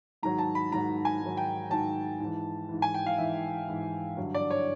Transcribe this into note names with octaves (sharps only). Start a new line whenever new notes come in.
G#2 D#3 F#3 A#5
A5
B5
G#2 D#3 F#3 A#5
G#5
G#2 D#3 F#3
G5
G#2 D#3 F#3 A5
G#2 E3
G#2 E3
G#5
G5
F5
G#2 E3 E5
G#2 E3
G2 D3 F#3
D5
C#5